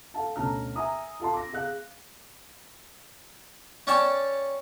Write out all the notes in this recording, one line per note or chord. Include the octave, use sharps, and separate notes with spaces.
A4 F5 A5
D2 B2 C#4 A5 A#5 F6
E5 G#5 A#5 D#6
F4 A4 F5 A5 C6
D6 A#6
G#4 F5 F#6
C#4 C#5 D5 G5 A5